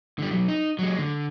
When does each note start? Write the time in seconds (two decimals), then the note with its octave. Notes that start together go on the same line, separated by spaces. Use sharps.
0.19 D3 G3
0.31 B1 F#3
0.48 D#4
0.79 F#3 G#3
0.98 D3